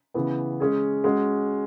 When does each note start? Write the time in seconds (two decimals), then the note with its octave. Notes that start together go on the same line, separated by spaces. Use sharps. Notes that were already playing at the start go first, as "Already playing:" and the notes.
0.14 C#3 E3 B3
0.60 G#3 C#4 G#4
1.04 G#3 C#4 F#4